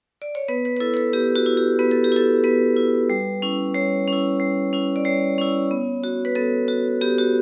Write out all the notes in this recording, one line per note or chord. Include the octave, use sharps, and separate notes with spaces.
D5
C#5
B3 B4
B4
B4
E4 A4
B4
A4
B3 G4
F#4
E4
G4
B3 B4
A4
G4
E4 A4
B3 B4
E4
G3
C#4 E4
G3 C#5
C#4 E4
G3
C#4 E4
D5
G3 C#5
C#4 E4
B3
F#4
B4
B3 A4
F#4
B3 G4
F#4